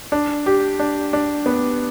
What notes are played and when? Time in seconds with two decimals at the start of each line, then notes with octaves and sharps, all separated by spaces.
0.12 D4
0.46 G4
0.79 D4
1.13 D4
1.46 B3